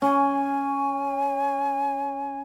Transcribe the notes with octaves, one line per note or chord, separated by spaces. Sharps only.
C#4 G#5